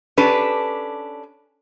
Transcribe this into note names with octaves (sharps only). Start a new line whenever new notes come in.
C#4 D4 G4 A4 B4